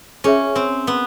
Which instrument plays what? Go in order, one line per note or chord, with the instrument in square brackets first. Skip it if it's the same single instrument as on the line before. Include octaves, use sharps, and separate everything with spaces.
[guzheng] C#4 [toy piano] F4 G#4 C#5 E5
[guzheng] C4
B3